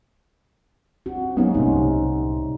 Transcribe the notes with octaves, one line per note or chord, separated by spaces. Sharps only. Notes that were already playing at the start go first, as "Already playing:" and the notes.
C4 F#4
F#3 G3 A#3 B3 C#4 D#4
C2 A2 C3 D#4